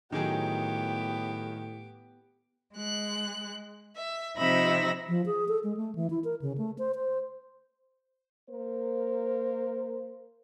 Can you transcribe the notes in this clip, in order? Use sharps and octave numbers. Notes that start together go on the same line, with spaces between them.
A2 D#3 F#3 B3 G4 G#4 D6
G#3 F#6
E5
C3 F3 D#4 E5 B5 A#6
F3
G#4
A4
G#3
A3
E3
E4
A#4
C#3
A3
C5
C5
A#3 A#4 C5